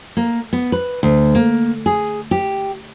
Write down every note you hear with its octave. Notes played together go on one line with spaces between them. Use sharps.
A#3
B3
B4
D2
A#3
G#4
G4